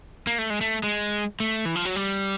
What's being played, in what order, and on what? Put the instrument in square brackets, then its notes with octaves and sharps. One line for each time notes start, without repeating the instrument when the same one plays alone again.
[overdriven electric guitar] A#3
A3
G#3
A3
G#3
A3
E3
F3
F#3
G3